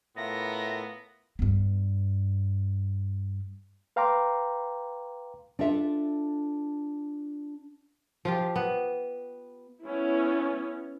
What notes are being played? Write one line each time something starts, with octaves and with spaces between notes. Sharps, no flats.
A2 B3 F4 A#4 E5 A#6
G2 B3
B4 F5 G5 A#5 C6 D6
D4 F4 A4 E5
F3 F4 G4
B3
B3 C#4 E4